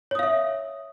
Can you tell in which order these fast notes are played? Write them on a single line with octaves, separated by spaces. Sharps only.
C#5 D#6 F5 E5